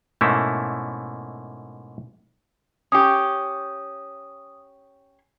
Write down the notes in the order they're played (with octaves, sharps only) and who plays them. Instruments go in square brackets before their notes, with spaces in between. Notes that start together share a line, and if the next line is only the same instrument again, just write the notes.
[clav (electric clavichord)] G#2 B2 A3 A#3 C#4 E4
[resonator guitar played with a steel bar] C#4 G4 [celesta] D#6